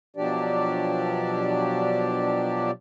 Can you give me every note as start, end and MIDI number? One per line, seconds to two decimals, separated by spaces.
0.16 2.71 47
0.16 2.71 53
0.16 2.71 54
0.16 2.71 62
0.16 2.71 67
0.16 2.71 74